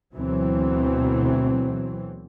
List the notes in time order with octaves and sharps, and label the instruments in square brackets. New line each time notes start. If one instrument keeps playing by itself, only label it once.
[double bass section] D2 B2 E3 F#3 C4